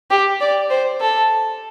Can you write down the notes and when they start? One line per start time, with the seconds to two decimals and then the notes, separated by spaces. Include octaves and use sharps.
0.11 G4
0.41 D5
0.70 C5
1.01 A4